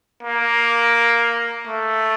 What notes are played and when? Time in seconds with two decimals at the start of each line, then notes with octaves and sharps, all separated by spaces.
0.23 A#3
1.67 A3